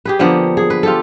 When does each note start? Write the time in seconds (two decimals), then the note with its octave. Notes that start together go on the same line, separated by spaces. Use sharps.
0.05 G4 G#4 B4
0.19 D3 F3 A#3 B3
0.57 G#4
0.70 B4
0.83 F4 G4 A4